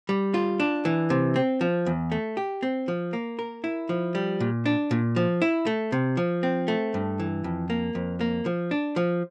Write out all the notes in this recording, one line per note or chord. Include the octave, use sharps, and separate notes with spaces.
G3
F4
D4
E3
C3
C4
F3
E2
A3
G4
C4
F3
A#3
A#4
E4
F3
G3
A#2
D4
A#2
F3
E4
A3
C3
F3
C4
A3
G2
E3
F2
A#3
F2
A#3
F3
D4
F3